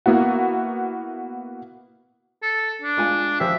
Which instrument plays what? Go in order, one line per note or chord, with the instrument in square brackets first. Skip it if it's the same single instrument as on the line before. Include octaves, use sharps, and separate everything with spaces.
[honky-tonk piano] A#3 B3 E4 F#4
[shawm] A4
D4
[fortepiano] G#3 F4 G#5
[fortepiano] F3 G4 [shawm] E5